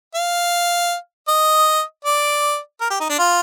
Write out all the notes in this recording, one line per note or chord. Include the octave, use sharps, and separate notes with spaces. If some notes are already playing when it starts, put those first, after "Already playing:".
F5
D#5
D5
A#4
G4
D#4
D4
F4